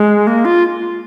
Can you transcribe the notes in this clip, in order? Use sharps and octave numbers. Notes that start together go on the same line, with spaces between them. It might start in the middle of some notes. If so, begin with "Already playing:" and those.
Already playing: G#3
A#3
F4